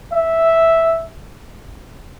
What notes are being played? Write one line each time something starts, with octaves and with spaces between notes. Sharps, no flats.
E5